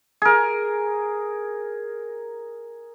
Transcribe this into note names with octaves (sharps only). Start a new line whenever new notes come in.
G#4 A#4